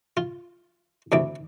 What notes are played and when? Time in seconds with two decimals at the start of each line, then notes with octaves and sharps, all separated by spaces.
0.17 F4
1.12 D2 C3 E3 E5 D6